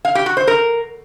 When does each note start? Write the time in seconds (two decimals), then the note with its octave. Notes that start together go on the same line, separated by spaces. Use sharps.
0.05 F5
0.15 G4
0.26 F#4
0.37 C5
0.47 A#4